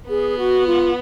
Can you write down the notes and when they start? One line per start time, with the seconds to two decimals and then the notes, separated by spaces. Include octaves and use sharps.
0.08 B3 G#4
0.37 F#4
0.65 F4